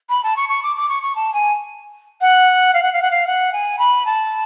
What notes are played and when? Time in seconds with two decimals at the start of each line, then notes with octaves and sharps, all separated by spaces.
0.09 B5
0.23 A5
0.36 C#6
0.49 C#6
0.63 D6
0.76 D6
0.89 C#6
1.02 C#6
1.15 A5
1.33 G#5
2.21 F#5
2.73 F5
2.82 F#5
2.92 F5
3.02 F#5
3.10 F5
3.27 F#5
3.52 G#5
3.78 B5
4.05 A5